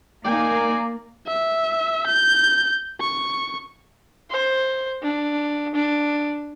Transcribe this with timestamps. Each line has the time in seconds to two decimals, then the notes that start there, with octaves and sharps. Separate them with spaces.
0.25 A#3 D#4 D5 G#5
1.27 E5
2.07 G6
3.01 C#6
4.30 C5
5.03 D4
5.75 D4